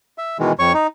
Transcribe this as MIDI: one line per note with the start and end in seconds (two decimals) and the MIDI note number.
0.18 0.37 76
0.39 0.52 47
0.39 0.52 51
0.39 0.52 52
0.39 0.52 56
0.59 0.73 41
0.59 0.73 73
0.59 0.73 85
0.74 0.87 63